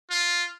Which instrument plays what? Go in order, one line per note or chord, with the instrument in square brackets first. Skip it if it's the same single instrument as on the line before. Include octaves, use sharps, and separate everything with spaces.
[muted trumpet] F4